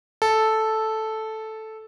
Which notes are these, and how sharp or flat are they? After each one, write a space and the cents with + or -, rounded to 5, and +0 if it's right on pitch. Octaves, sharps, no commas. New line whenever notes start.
A4 -5